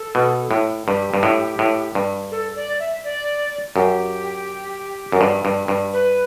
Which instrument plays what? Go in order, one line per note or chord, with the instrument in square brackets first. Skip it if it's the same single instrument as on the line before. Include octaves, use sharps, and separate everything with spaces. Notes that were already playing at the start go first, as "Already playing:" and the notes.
Already playing: [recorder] A4
[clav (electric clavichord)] B2
A2
[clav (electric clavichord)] G2 [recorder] G4
[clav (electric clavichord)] G2
A2
A2
G2
[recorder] A4
D5
E5
D5
[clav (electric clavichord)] F#2 [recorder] G4
[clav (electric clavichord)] F#2
G2
G2
G2
[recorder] B4